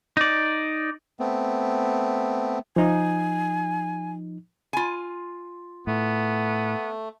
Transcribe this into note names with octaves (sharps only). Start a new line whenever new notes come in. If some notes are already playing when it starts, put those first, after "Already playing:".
D#4 D5
A3 B3 C4
F3 D#4 G#5
F4 G#5
A2 A3 B3